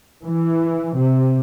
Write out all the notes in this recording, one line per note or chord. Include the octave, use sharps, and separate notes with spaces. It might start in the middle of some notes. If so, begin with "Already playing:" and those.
E3
C3